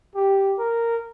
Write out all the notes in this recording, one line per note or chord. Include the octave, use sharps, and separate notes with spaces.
G4
A#4